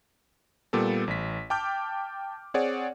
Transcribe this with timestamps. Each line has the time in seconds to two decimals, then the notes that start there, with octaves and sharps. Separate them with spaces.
0.73 A#2 G3 B3 A4
1.07 A1 B6
1.50 G5 A5 D6 F6 G6
2.54 C4 G#4 C#5 D5 F#5